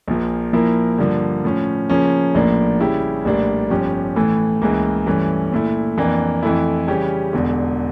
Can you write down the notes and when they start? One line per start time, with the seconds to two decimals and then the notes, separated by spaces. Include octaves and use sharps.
0.08 A#1 A#2 F3 A#3
0.53 A#2 F3 A#3 E4 A#4
0.98 G2 D3 F3 A#3
1.44 A2 F3 C#4
1.90 C#3 F3 A#3 C#4
2.34 A#1 A2 F3 A#3 D4
2.80 C#3 G3 C#4 E4 G4
3.25 A#1 A2 G3 A#3 D4
3.70 G1 G2 F3 C#4 G4
4.16 A2 E3 A3
4.62 C#2 C#3 E3 A#3
5.06 G2 E3 A3 C#4
5.52 A#2 A3 E4
5.97 F2 E3 A#3 D4
6.43 F2 E3 A3 E4
6.87 C#3 E3 G3 C#4 G4
7.33 E1 E2 D3